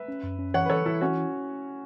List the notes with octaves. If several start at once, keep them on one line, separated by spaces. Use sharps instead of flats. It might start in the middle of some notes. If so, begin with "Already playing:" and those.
Already playing: B4 E5
C#4
F#2
C#4
E3 C#5 F#5
B4
E3 A4 C#5
E3 E4 A4
C#4 E4 F#4
E4